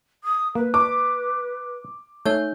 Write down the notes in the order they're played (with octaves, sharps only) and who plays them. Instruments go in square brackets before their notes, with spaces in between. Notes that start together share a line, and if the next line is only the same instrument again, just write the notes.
[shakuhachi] D#6
[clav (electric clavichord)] A#3 [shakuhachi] B4
[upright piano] D6
[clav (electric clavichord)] A3 [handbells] D#4 C#5 G6